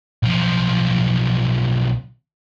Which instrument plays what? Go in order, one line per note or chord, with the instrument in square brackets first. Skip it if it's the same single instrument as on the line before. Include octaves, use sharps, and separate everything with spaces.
[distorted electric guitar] B1 F3